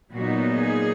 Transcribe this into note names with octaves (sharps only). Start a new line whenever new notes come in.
A#2 F#3 B3 D#4 F#4
G#4